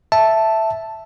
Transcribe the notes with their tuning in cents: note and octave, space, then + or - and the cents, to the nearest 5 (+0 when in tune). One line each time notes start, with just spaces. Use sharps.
E5 +0 A5 +0